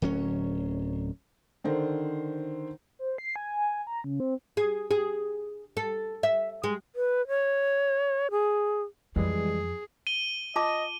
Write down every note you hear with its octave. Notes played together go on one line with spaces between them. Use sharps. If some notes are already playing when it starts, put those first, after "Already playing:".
D1 F#3 C#4
D3 D#3 C5
C5
C7
G#5
A#5
C#3
C4
G#4
G#4
A4
E5
G#3
B4
C#5
G#4
F2 E3 G3 G#3 G#4
D#7 G7
F4 D#5 A5 D6